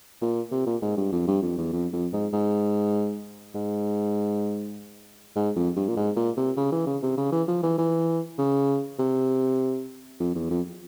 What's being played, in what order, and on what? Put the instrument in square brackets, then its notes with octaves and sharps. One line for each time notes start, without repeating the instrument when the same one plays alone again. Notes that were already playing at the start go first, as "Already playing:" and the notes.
[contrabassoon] A#2
C3
A#2
G#2
G2
F2
G2
F2
E2
F2
F2
G#2
G#2
G#2
G#2
F2
G2
A#2
G#2
A#2
C3
C#3
E3
C#3
C3
C#3
E3
F3
E3
E3
C#3
C3
F2
E2
F2